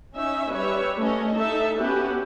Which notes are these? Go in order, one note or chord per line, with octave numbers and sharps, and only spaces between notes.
C#4 D#4 E5
G3 B4 C#5 E5
A3 C#4 D#5
D#4 A4 E5 A5
B3 C#4 F#4 G4 B4